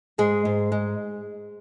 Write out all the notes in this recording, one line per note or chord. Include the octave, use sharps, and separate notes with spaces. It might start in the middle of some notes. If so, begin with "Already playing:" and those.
G#2 G#3 G#4
G#2
G#3